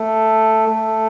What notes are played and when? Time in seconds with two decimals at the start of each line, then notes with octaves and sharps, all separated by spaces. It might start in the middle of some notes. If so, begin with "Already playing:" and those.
Already playing: A3
0.68 A3